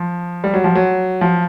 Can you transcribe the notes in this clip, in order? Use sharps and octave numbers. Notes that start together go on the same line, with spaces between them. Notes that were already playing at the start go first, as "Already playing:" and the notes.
Already playing: F3
G3
F#3
F3
F#3
F3